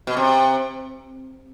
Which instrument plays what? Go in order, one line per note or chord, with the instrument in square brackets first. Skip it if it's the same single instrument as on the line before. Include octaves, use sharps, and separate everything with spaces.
[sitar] B2
C3